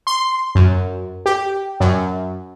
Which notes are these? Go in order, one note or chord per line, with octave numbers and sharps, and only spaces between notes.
C6
F#2
G4
F#2